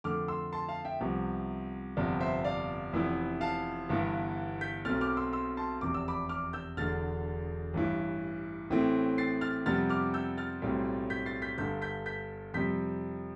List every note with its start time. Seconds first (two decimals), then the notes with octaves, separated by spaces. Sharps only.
0.04 F2 D3 A3 D6 F6
0.28 C6 E6
0.53 A5 C6
0.69 F5 A5
0.85 E5 G5
1.01 C2 C3 F3 B3
1.97 G1 F2 C3 G3 B3 D5
2.20 C5 E5
2.44 D5 F5
2.93 F1 F2 E3 B3
3.41 F5 A5
3.89 G1 G2 E3 B3
4.61 G6 B6
4.85 B1 B2 A3 C4 F6 A6
5.01 D6 F6
5.17 C6 E6
5.33 C6 E6
5.57 A5 C6
5.81 F1 E2 C3 D6
5.94 E6
6.08 B5 D6
6.29 D6 F6
6.53 E6 G6
6.77 E1 E2 D3 F6 A6
7.74 A1 G2 E3
8.70 A1 A2 E3 A3 C4
9.18 A6 C7
9.41 F6 A6
9.66 F2 C3 G3 B3 F6 A6
9.90 D6 F6
10.14 E6 G6
10.38 F6 A6
10.62 B1 A2 G3 C4
11.10 G6 B6
11.26 A6 C7
11.42 G6 B6
11.58 G1 G2 D3 G6 B6
11.82 G6 B6
12.06 G6 B6
12.54 F2 C3 G3 G6 B6